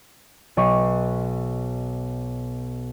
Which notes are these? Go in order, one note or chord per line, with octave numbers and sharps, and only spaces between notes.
B1 D#5 C#6